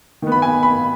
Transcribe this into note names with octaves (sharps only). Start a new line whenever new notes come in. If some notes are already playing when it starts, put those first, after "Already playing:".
D#3 B3
B5
G#5
B5